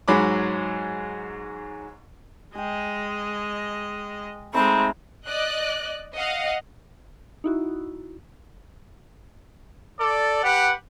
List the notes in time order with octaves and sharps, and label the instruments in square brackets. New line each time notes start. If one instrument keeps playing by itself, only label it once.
[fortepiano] G#2 F#3 G#3 B5 D6
[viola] G#3 D#5 [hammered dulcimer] G#4 G5
[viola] G#3 C4 [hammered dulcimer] A3 D#4 G#5 [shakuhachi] B5
[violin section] D5 D#5 F#6
D#5 F5 F#5
[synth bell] D#4 E4 F#4
[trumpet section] A4 D5
G4 B4 F#5